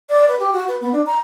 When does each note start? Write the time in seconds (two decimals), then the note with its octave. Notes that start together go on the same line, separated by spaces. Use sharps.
0.10 D5
0.28 B4
0.39 G4
0.53 F#4
0.68 B4
0.81 B3
0.92 D4
1.06 A#5